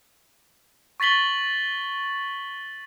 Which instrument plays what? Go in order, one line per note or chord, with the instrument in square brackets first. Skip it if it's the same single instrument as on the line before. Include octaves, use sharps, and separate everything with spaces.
[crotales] C#6 A6 B6 F#7 G7